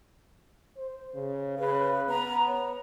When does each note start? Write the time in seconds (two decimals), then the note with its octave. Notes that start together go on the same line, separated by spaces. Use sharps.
0.77 C5
1.15 C#3
1.58 C#3 B4
2.09 B3 A#5 B5
2.47 C#5